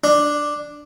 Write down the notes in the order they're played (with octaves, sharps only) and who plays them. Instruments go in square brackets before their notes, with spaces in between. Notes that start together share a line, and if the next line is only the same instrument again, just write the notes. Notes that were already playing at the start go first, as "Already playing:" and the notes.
[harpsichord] D4